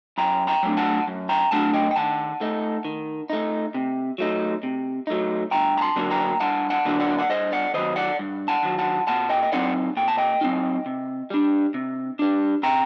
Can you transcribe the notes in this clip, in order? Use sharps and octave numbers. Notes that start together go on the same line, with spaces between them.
F#2 G5 A#5
G5 A#5
F#3 A3 D4
F#5 A5
F#2
G5 A#5
F#3 A3 D4 F#5 A5
D#5 G5
G5
D#3 F#5 A5
A3 D#4
D#3
A3 D#4
C3
F#3 A3 D#4
C3
F#3 A3 D#4
G2 G5 A#5
A#5
A5 C6
D3 F#3 A#3 D4
G5 A#5
G2 F#5 A5
F#5 A5
D3 F#3 A#3 D4
D5 F#5
F#5
G2 C5 D#5
D5 F#5
D#3 F#3 C5 D#5
D5 F#5
G2
F#5 A5
D#3 F#3
F#5 A5
A#2 F#5 A5
D#5 G5
D#5
F#3 C4 D#4 D5 F#5
A#2 G5
A5
D#5 G5
F#3 C4 D#4
C3
G3 D4
C3
G3 D4
C3 G5 A#5